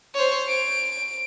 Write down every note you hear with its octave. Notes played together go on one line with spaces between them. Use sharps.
C5 C#5
D7